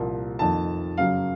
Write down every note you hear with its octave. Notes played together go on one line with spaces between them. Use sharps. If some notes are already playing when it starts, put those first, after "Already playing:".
Already playing: C2 A#2 F3 A#3
F2 D#3 A#3 A5
F#2 C#3 F#3 F5